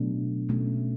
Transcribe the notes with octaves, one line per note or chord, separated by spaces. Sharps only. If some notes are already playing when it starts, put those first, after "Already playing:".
Already playing: B2 F#3 A3 D4
B2 A3 C#4